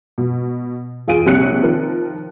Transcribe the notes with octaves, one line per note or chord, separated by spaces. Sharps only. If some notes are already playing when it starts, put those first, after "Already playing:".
B2
E2 F4 G#4 D7 D#7
A#1 C3 G3 C#5 F#6 C#7
D#3 F3 A#4